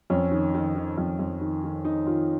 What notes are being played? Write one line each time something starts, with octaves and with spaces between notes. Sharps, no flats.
F2 C#4
D#3
D#3
D#3
F2
F2
D#3
D#3
D#3 D#4
D#3 F4